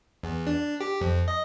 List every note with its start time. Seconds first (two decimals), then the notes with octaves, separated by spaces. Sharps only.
0.23 E2
0.47 D4
0.81 G4
1.01 F2
1.28 D#5